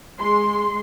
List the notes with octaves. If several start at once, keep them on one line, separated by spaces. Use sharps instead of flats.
G#3 C6